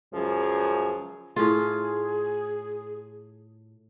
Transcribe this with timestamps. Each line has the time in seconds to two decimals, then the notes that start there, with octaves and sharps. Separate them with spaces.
0.13 C#2 F#2 F3 G#4
1.36 A2 F4 G#4